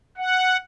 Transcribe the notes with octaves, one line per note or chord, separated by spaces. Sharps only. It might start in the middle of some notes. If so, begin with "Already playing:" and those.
F#5